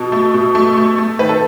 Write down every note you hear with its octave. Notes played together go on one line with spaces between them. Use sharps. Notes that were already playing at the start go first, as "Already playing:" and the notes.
Already playing: B2 A4
A3
B2
A3
A3
A3
D#3 B4
A4